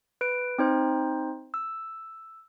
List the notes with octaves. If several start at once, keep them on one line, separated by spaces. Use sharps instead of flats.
B4 D7
C4 D#4 C5
E6